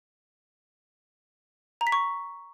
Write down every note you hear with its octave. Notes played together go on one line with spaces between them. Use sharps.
A#5
B6
C#6